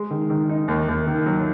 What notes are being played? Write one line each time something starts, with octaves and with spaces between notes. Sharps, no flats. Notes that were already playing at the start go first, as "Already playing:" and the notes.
Already playing: G#3
D#3
D#3
D#4
D#2
D#2
D#3
F#3